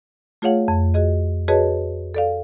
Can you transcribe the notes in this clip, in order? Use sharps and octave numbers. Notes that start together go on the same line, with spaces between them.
A3 F4 G#4 C#5 F5 F#5
F2
F#4 G#4 D#5
F#4 G#4 B4 C#5 D#5 A5
A4 D5 F5